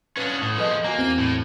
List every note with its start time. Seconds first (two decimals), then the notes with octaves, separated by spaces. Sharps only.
0.17 C#4 D4 B4 F5 F#5 B5 D#6
0.41 A2
0.57 F3 G#4 A4 B4 D#5
0.84 A#3 F#4 G#5 A#5
0.98 E2 C4 D#7
1.19 A2